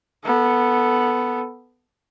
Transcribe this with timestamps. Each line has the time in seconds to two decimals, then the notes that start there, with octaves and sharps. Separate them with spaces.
0.25 B3 A4